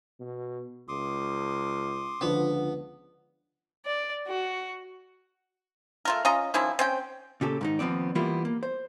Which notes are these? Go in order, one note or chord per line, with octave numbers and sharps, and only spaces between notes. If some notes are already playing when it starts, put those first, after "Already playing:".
B2
C#2 C6 D6 D#6
C#2 D3 F3 B3 D4
D5
F#4
A3 F4 A#4
C#4 F4 D#5 A#5
D#3 F3 C#4 E4
C4 C#4 G5
A#2 C#3 G4 A4
G#2 D#3 D#4
D#2 F3 B3 C4 D5
E3 G3 A#3 B3 E4 F4
A#3
C5